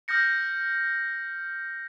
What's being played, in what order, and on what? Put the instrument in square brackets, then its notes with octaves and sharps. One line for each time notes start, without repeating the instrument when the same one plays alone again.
[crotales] D#6 F6 G6 A#6 C#7